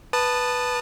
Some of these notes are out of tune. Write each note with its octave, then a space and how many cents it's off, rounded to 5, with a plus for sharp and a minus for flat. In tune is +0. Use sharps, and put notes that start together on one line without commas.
B4 +0 A5 +0 D#6 -25